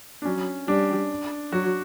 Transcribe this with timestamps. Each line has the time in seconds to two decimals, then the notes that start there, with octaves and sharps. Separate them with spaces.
0.22 D4
0.25 F#3 C#4
0.68 G3 D4
1.52 F#3 F#4